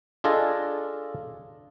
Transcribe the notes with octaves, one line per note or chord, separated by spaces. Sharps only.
D4 F4 G#4 A4 D#5